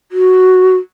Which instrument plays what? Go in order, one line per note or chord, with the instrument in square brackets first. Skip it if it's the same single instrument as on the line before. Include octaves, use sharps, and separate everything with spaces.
[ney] F#4